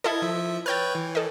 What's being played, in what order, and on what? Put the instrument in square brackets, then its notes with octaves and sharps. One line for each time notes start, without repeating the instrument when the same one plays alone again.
[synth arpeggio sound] E4 A4 [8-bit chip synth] D#5 G#6
[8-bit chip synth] F3 E5
[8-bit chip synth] B4 C#5 G5 [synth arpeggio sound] F6 G6 A6
[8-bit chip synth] E3
[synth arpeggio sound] A4 D#5